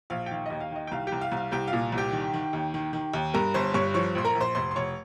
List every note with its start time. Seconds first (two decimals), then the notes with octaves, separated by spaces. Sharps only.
0.10 A#1 F5
0.26 G5
0.31 D#3 F5
0.46 D#2 D#5
0.60 F5
0.71 D#3 D#5
0.87 G5
0.91 C2 F5
1.07 G4 G5
1.12 C2
1.21 F5
1.32 C2
1.37 F5
1.51 C2 G4 G5
1.68 F5
1.73 A#2
1.92 C2
1.97 G4 G5
2.13 D#3
2.33 D#3
2.53 D#2
2.74 D#3
2.93 D#3
3.13 D#2
3.34 G2 A#4 A#5
3.54 G1 C5 C6
3.74 G2 C#5 C#6
3.94 F3 C#5 C#6
4.15 A#1 C6
4.24 A#4 A#5
4.35 A#1
4.41 C5 C6
4.55 F1 C5 C6
4.71 C6
4.76 F1 C#5 C#6